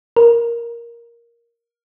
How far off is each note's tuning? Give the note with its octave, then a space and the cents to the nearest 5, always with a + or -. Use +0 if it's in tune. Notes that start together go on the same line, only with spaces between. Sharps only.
A#4 +5